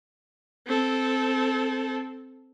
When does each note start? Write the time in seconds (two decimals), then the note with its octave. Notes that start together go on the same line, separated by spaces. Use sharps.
0.67 C4 A4